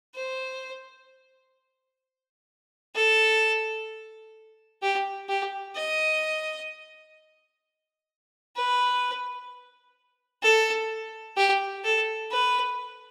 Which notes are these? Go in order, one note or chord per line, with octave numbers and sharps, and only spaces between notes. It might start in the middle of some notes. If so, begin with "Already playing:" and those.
C5
A4
G4
G4
D#5
B4
A4
G4
A4
B4